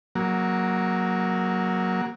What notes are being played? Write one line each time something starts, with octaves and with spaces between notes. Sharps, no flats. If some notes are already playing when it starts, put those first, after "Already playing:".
F#3 A#3